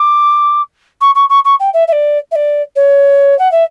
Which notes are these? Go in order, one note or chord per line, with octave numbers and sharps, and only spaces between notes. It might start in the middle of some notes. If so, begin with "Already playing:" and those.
Already playing: D6
C#6
C#6
C#6
C#6
G5
E5
E5
D5
E5
D5
C#5
F#5
E5